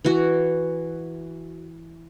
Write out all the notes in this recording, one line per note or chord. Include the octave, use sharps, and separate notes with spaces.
E3 F#4